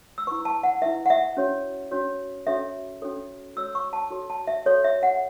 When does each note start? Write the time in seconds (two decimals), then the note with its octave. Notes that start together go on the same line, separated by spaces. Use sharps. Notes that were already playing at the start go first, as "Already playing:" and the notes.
0.18 E6
0.27 E4 B4 C#6
0.45 A5
0.63 F#5
0.82 B4 E5
0.86 E4
1.06 F#5
1.10 E5
1.37 C#4 F#4 C#5
1.91 C#4 F#4 C#5
2.47 C#4 F#4 A4 C#5 E5
3.02 C#4 F#4 A4 C#5
3.56 F#4 A4 C#5 E6
3.75 C#6
3.93 A5
4.11 F#4 A4 C#5
4.30 A5
4.47 E5
4.66 F#4 A4 C#5
4.84 E5
5.03 F#5